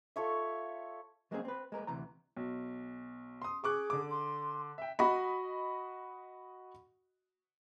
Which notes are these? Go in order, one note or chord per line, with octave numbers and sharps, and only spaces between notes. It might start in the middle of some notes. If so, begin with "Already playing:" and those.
F4 A4 C#5 E5
F#3 G#3 A#3 C4 C#4 G#4
C4 B4
G#3 A#4 B4
D2 C3 E3 A#5
B1
C6 D#6
G#4 C#6 D6 F#6
D3 D6
C6
E5 G5
F#4 D#5 B5